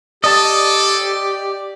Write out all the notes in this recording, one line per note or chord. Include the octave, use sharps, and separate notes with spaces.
G4 A4 D5 D#5 A5